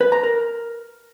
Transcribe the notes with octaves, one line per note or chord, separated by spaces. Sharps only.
B4
A#5
A#4